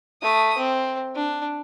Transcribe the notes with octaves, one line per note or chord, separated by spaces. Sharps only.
A3 D#6
C4
D4